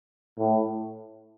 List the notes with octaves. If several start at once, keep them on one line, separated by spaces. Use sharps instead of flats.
A2